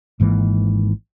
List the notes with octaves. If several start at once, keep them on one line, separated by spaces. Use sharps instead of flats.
G#1 G#2 E3 A#3